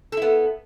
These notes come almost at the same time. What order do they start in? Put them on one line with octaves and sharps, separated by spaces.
A4 E4 B3